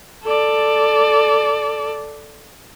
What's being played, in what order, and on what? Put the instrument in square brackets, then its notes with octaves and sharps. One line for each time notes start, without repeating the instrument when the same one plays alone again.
[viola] A4 D5